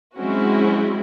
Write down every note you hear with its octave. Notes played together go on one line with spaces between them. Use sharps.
F#3 G#3 C4 C#4 E4 F#4